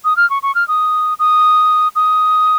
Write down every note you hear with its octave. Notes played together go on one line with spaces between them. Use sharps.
D#6
F6
C#6
C#6
F6
D#6
D#6
D#6